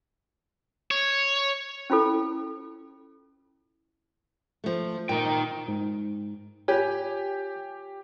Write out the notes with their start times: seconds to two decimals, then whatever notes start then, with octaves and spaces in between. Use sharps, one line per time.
0.91 C#5
1.90 C#4 E4 F4 A4
4.64 F3 A3
5.09 A#2 D#4 G5
5.68 G#2
6.68 F4 G4 C#5 G#5